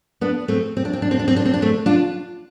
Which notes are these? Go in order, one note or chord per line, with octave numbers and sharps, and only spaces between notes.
B3 D4
A3 C4
C4
D4
C4
D4
C4
D4
C4
D4
C4
D4
A3 C4
D4 F4